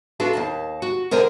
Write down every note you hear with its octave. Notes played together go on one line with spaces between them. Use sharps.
B3 D4 F4 F#4 A4
D#2 A#3 A5
F#4
B2 D3 A#4 C5 D5 G#5